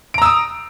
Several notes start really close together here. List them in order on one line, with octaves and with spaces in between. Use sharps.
D7 A#5 E6 D#6